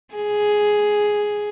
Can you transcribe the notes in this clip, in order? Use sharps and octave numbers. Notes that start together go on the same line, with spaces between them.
G#4